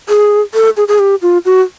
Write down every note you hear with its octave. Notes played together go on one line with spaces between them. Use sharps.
G#4
A4
G#4
G#4
G4
F4
F#4